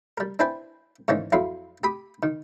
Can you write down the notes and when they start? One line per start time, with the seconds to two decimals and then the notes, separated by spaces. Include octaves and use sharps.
0.18 G3 A#4
0.39 D4 E4 B4 C5 G5 G#5
1.08 G#2 D#3 E3 A#3 C#4
1.32 F2 F#3 E4 F5 C6
1.84 G4 B5 D#6
2.23 D#3